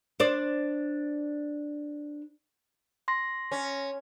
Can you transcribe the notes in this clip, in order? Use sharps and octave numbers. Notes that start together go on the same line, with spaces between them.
D4 C5 D5
C6 A#6
C#4